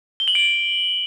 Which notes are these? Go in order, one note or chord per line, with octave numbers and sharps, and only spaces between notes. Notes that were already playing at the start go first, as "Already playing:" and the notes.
G7
F#7
D7